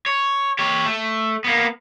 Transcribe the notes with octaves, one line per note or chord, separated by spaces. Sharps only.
C#5
G4 C#5
A3
A#3 B3